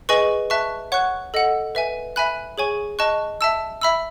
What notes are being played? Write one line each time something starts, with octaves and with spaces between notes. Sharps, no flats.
G#4 B4 D#5 G#5 C#6
E5 A5 C#6 F#6
C#5 F#5 C#6 F#6
A4 D#5 F#5
B4 E5 G#5
E5 G#5 B5 F#6
G#4 C#5 G#5 C#6
D#5 A5 C#6 F#6
E5 A5 E6
E5 B5 E6